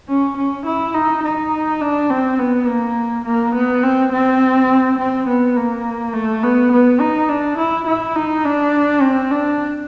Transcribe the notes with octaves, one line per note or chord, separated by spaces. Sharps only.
C#4
C#4
E4
D#4
D#4
D4
C4
B3
A#3
A#3
B3
C4
C4
C4
B3
A#3
A3
B3
B3
D#4
D4
E4
E4
D#4
D4
C4
D4